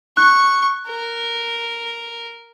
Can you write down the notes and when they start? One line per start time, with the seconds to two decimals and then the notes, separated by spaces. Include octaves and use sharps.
0.17 C#6 F#6
0.87 A#4